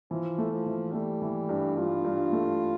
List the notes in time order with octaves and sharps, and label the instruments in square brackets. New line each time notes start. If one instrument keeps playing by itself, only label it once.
[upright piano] E3 [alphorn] F3
[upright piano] A3
[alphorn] F3
[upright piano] E3
[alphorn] G3 [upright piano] A3
[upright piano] E3
G2
[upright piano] G2 [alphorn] F4
[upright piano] G2
A3